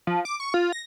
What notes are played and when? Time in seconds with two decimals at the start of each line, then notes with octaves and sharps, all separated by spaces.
0.07 F3
0.25 D6
0.40 C#6
0.54 F4
0.73 A#6